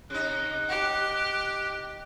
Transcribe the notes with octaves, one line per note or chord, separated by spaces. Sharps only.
C3 D#4 F#6
G4